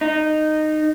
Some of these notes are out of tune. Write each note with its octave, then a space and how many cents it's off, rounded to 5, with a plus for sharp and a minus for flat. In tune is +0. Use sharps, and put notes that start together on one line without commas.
D#4 -15